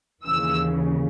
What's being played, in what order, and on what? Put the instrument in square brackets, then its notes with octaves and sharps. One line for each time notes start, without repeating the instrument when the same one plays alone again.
[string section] D#2 C#3 E3 E6